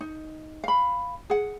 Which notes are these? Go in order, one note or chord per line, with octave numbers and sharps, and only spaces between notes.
D#4
F5 B5
G#4 F#5